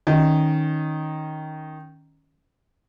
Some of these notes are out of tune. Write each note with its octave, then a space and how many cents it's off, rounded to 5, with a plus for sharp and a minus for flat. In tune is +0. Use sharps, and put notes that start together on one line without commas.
D#3 +0 C#4 +0 D#5 +0